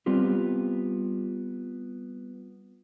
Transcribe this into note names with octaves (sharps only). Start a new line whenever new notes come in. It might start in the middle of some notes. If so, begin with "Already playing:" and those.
G3 B3 C4 F4 G4